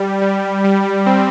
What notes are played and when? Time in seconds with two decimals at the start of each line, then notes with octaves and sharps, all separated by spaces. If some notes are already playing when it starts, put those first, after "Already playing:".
Already playing: G3
0.22 G3
0.64 G3
1.06 C4